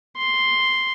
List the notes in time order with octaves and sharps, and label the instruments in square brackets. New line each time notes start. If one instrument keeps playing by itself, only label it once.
[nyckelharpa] C6